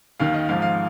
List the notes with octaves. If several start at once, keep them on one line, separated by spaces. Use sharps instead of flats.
D#2 D#3 F5
D#5
G#1 G#2 F3 F5
F5